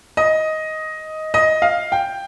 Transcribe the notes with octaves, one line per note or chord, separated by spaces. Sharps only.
D#5
D#5
F5
G5